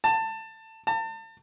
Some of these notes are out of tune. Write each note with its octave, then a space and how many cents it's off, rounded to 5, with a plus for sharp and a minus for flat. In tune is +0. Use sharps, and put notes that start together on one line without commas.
A5 +20
A5 +35